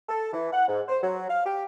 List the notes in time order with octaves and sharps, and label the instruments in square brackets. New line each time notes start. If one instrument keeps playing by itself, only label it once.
[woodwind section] A4
E3
F#5
G#2
C5
F#3
F5
G4